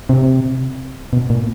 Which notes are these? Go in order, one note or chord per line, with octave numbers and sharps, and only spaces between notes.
C3
B2
A#2